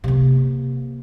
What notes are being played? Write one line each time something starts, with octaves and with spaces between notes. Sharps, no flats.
C3 A#3